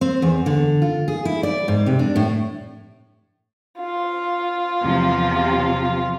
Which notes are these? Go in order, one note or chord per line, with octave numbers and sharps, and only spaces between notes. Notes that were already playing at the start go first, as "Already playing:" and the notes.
C4
E2
D3
F4
G#4
E4
D5
G#2
C3
D4
A2
F4
E2 C3 F3